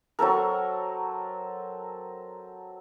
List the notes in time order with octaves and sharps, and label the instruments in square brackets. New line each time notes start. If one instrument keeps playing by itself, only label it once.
[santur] F#3 C4 A4 A#4